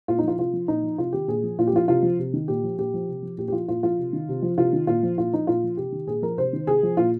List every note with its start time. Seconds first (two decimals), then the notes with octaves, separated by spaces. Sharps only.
0.08 A#2 F4
0.19 D#4
0.23 F3 F4
0.38 C3 F4
0.53 F3
0.68 A#2 D#4
0.83 F3
0.98 C3 F4
1.13 D#3 G4
1.28 A#2 G#4
1.43 F3
1.58 A#2 F4
1.67 G4
1.73 F3 F4
1.88 C3 F4
2.03 F3
2.19 C3
2.33 D#3
2.48 A#2 G4
2.63 F3
2.78 A#2 G4
2.94 F3
3.08 C3
3.22 F3
3.38 A#2 G4
3.48 G4
3.52 F3 F4
3.68 A#2 F4
3.83 F3 F4
3.99 C3
4.13 D#3
4.29 C3
4.42 F3
4.58 C3 F4
4.73 D#3
4.87 A#2 F4
5.03 F3
5.17 A#2 F4
5.33 F3 D#4
5.47 A#2 F4
5.63 F3
5.77 C3 G4
5.92 D#3
6.07 A#2 G#4
6.22 F3 A#4
6.38 C3 C5
6.53 D#3
6.67 C3 G#4
6.83 F3
6.97 A#2 F4